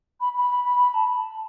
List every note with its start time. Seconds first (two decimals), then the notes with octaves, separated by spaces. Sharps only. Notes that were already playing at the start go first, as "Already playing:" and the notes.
0.20 B5
0.37 B5
0.65 B5
0.79 B5
0.94 A5